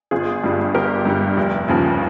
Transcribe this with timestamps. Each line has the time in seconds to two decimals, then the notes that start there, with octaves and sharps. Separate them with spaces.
0.11 G1 F4 G#4
0.44 G2 G3
0.74 G1 G4 A#4
1.06 G2 G3
1.37 F1
1.68 D#2 C#3 F3